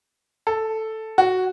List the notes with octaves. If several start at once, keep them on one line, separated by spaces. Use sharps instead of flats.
A4
F#4